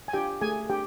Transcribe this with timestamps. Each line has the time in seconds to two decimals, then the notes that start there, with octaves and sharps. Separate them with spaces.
0.08 G#5
0.13 D4 F4 G4 G5
0.41 A3 G#4 G#5
0.70 D4 G4 G5